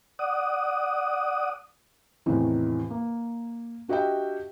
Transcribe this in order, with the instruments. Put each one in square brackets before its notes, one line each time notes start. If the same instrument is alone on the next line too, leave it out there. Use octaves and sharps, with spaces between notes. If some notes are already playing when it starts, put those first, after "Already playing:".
[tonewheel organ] D5 F#5 D#6
[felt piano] E2 A2 C3 D#3 E3
A#3
D4 F#4 G4 D#5 E5 G5